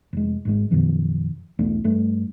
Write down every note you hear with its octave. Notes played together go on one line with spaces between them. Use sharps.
F1 G#3
G#1 G#2 G#3
F#2 B2 D#3 F3
B1 E2 A3 D4
G2 A3